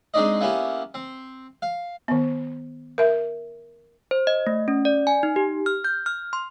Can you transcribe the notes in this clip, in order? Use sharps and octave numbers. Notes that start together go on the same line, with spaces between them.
G#3 C4 D4 D#4 D5 D#5
A#3 B3 C#4 E4 G4
C4
F5
D#3 B3
A#4 E5
C5
D#5
A3
C#4
D5
G#5
D#4
G4
F6
G6
F6
C6